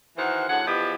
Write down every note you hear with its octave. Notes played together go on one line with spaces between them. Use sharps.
D#3 E3 F#4 A#4 C5 F#5
A2 D3 F#4 G#4 F#5
E2 F3 B3 E4 G4 D#5